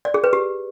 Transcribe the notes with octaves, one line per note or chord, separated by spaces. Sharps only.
D5
G#4
B4
G4